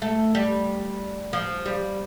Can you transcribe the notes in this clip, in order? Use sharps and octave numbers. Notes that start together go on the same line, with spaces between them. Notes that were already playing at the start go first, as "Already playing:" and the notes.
A3
G3
F3
G3